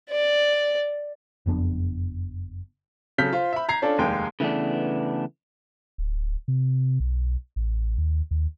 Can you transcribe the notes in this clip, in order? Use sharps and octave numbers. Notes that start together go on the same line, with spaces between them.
D5
F#1 F2 B3 D4
C#3 F#3 A4 F6 G6 B6
F4 C5
E5 B5
A#5 G#6 C7
C#4 D4 F4 A4 D5
F1 D#2 G#3 G5
C#3 E3 A3 B3 D4
D1
C3
B1
A1
D#2
D#2